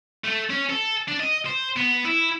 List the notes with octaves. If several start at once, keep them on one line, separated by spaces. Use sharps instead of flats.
A3
C#4
A4
D4
D#5
C5
B3
E4